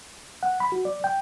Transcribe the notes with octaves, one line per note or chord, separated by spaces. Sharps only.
F#5
B5
F#4
D5
G5